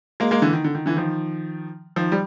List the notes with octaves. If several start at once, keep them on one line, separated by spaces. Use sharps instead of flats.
G#3 A#3
G#3 A#3
D3 E3
D#3
D3
D#3
D3 E3
D#3 F3
D#3 F3
G3